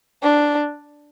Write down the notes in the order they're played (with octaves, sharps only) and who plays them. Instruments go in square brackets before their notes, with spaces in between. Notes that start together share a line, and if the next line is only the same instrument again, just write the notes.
[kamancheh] D4